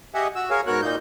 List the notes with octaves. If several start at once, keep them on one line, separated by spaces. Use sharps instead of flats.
G4 G#4 D#5 E5 F#5 G#5
F#4 E6
G#4 A#4 C#5 F5 G#5
G#2 B3 F#4 A#4 C#5 F#6
A#2 A#3 D#4 G6